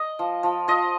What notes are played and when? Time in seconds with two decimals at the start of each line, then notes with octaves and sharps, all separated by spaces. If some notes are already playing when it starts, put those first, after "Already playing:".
Already playing: D#5
0.19 F3
0.43 F3
0.68 F3 D#5